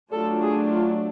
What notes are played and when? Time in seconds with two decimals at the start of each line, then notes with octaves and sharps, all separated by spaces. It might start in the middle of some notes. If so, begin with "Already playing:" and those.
0.13 F#3 A3 D4 F4 A4
0.41 G#4
0.69 F4